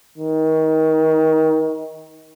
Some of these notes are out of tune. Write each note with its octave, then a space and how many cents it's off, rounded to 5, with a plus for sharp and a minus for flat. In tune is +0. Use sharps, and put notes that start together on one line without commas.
D#3 +25